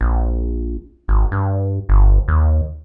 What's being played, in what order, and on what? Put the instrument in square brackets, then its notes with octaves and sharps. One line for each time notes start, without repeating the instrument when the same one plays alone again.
[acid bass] A#1
G#1
G2
G1
D#2